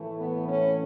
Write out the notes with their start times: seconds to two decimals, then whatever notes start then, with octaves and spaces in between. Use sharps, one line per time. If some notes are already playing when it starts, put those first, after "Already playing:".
Already playing: A2 E3 A3
0.20 B3
0.48 C#4